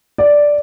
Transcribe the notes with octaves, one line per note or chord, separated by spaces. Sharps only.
D5